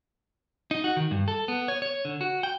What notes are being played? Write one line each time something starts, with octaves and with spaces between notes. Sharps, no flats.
D#4
F#4
D#3
G2
A4
B3
C#5
C#5
D3
F#4
G5